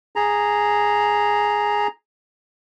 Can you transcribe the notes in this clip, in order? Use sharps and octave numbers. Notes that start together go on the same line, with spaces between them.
G#4 A#5